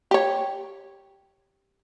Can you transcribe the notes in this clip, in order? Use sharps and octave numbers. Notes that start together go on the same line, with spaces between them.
G4 C#5